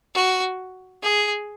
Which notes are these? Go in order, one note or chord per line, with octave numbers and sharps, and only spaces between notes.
F#4
G#4